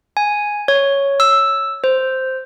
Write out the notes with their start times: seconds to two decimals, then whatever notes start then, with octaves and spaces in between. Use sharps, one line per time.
0.17 G#5
0.68 C#5
1.20 E6
1.84 C5